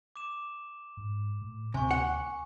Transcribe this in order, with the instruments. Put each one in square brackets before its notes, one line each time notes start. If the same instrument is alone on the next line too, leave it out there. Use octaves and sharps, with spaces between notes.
[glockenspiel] D6 E7
[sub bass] G#2
A2
[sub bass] D2 [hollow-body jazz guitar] C3 [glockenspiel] G#5 C#6
[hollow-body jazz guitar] F#5